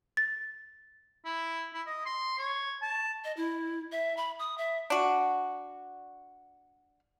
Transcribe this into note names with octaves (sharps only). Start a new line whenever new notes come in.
A6
E4
E4
D#5
C6
C#5
A5
D#5
E4
E5
B5
D#6
E5
D4 F#4